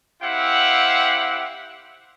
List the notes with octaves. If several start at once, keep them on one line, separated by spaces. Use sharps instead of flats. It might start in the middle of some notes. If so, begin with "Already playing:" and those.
C4 E4 G4 F5 F#5